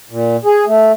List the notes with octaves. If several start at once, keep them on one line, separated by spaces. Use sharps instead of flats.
A#2
G#4
A3